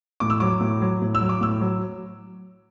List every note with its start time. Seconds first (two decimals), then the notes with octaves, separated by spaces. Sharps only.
0.20 A2 D6
0.30 E6
0.40 F#3 D6
0.61 A2
0.82 F#3
1.02 A2
1.15 E6
1.21 F#3
1.29 D6
1.41 A2 E6
1.61 F#3